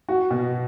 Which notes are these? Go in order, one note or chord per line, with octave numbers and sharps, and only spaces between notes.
F#4
B2